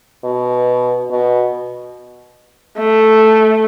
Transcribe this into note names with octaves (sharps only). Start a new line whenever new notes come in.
B2
B2
A3